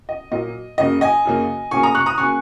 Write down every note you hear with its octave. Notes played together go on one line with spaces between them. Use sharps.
D#5
A#2 F#3 A#3 D#5
F#2 C#3 A#3 D#5
D#5 G#5
F#2 C#3 A#3
C#3 F#3 A#3 G#5 C#6
A#5 D#6
C#6 F#6
A#5 D#6
C#3 F#3 A#3 G#5 C#6